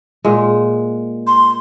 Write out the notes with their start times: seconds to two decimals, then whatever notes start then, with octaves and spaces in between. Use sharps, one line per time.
0.24 A#2 G#3
1.27 C6